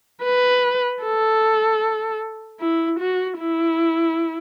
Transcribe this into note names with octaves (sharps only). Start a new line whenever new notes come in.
B4
A4
E4
F#4
E4